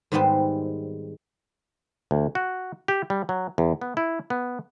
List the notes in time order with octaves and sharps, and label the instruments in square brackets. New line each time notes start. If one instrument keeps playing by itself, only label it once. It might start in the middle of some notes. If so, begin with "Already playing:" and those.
[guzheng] G#2 D#3 G3 G#3 B3 C4
[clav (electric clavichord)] D2
F#4
G4
G3
F#3
E2
B3
E4
B3